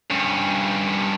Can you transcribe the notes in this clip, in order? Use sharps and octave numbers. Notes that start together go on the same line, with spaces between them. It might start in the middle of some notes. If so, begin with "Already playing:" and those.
G2 C#4